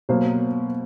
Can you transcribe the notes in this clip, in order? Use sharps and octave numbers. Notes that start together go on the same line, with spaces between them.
B2 F#3 A#3 C5